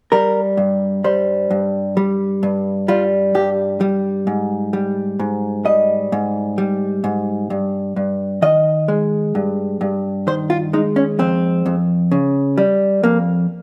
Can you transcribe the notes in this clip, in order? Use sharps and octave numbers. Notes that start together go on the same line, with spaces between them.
G3 A#4
G2
G3 C5
G2
G3
G2
G3 F4
G2 G4
G3
G#2
G3
G#2
G3 D#5
G#2
G3
G#2
G2
G2
D#3 D#5
G#3
G2
G2
D#3 C5
F4
G#3 D#4
C#4
F2 C4
F2
C#3
G3
F2 A#3